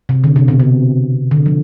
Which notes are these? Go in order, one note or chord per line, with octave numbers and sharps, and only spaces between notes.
C3
D3
C3
B2
C3
D3
F3